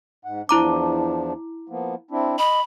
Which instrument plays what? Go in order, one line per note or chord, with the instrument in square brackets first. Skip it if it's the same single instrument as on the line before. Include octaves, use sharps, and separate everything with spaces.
[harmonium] G#2 F#5
[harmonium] E2 F3 D4 [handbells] E4 A#5 D6
[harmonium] F3 A#3 B3
C4 D4 E4
[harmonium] D#5 [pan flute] B5